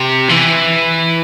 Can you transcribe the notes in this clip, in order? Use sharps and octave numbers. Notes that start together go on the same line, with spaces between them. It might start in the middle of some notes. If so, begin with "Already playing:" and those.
Already playing: C3
E3